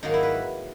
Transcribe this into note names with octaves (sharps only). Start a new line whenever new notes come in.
G#2 D#3 F#3 A#3 D#4
E4
B4